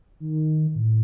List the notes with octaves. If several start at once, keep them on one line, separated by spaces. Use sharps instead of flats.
D#3
A2